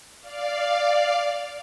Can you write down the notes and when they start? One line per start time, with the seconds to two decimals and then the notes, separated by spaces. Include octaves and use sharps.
0.20 D5 F5